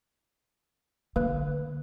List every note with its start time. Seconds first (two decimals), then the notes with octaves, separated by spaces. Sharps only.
1.16 D3 A#3 B4 F#6